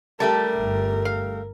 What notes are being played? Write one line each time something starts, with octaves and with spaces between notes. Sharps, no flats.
G3 A3 G4 A#4 A5
G1
F5